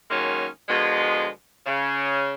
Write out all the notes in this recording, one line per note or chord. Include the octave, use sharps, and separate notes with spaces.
D#3 F#3 G#3 A#3 C#4
B2 D3 F3 G#3
C#3